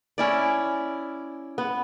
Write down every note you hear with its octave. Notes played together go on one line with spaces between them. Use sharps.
C#4 E4 D5
B3